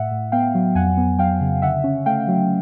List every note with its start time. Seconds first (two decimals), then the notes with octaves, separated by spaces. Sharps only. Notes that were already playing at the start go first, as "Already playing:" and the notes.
Already playing: A2 E5 F#5
0.11 A2
0.32 B3 F5 G5
0.55 F#3
0.75 F2 F#5 G#5
0.97 B3
1.19 F#3 F5 G5
1.41 C#3
1.62 D3 E5 F#5
1.84 C#4
2.06 A3 F5 G5
2.28 F#3